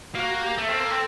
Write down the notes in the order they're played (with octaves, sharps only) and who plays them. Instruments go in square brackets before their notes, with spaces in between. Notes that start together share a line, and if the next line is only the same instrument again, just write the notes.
[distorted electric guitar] A#3 [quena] F#4
[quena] F#4
G4
[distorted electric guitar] A3 [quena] A4
[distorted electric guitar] C4
A#3
C4